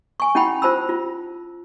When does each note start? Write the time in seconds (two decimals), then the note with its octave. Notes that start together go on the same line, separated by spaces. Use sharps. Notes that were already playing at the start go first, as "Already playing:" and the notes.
0.20 G#5 C#6
0.35 C#4 E4 F#5 G5 B5
0.62 F4 C5 A5 B5 E6
0.89 F4